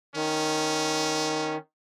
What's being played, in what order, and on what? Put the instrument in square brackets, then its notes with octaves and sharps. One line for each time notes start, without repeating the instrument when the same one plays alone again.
[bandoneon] D#3 [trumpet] C#4